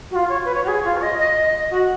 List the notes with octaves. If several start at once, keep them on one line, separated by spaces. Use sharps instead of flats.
F#4
F4
C#5
B4
C#5
F#4
G#4
F4
C#5
D#5
D#5
D#5
F#4